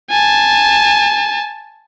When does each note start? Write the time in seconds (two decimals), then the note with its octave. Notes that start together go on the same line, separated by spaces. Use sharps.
0.10 G#5 A5